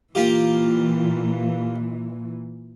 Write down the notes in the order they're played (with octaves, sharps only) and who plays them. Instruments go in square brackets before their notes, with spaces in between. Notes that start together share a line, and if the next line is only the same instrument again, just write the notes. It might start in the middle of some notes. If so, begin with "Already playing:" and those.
[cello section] A#2 E3 [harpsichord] A#3 F4 G4